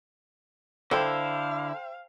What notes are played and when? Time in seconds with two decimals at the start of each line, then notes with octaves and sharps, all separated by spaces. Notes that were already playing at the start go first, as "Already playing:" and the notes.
0.91 D3 E4 A4 C5 F5 G5